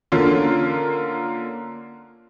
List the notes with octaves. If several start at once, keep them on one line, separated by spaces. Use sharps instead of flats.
D3 A#3 C#4 F4